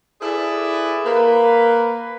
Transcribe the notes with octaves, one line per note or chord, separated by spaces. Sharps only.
E4 G#4 A4 B4 D5
A#3 B4